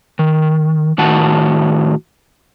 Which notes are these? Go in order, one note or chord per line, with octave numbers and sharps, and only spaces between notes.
D#3
A2 D#3 F#4 F#5 A5